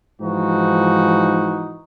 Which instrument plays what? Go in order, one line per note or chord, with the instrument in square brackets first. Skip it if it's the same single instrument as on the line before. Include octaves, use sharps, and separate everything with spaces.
[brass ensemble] G#2 E3 F3 D#4 F#4